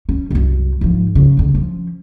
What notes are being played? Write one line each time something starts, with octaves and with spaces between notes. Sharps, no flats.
C#4
C2 F#2
G#2 F3
C#3
F1 F2
F3 C#4